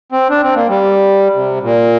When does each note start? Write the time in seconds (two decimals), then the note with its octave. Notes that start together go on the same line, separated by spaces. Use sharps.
0.12 C4
0.30 D4
0.43 C4
0.56 A#3
0.69 G3
1.35 C3
1.62 A#2